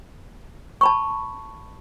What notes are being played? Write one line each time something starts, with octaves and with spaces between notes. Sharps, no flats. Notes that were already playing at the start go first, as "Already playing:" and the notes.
A5 B5 C#6